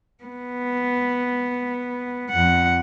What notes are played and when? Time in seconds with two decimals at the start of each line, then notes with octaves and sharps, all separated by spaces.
0.24 B3
2.31 F2 F#5